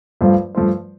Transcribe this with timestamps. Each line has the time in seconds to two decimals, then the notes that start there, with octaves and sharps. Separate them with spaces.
0.21 G2 F3 A3 F4 C5
0.55 G2 F3 A3 F4 C5